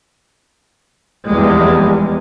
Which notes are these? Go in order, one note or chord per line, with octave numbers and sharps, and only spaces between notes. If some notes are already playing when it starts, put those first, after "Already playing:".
F1 E2 G3 G#3